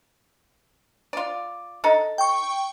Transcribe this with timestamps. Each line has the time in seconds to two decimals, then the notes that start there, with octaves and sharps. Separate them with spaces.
1.13 F4 D5
1.84 D#4 A4 A5
2.18 G5 C#6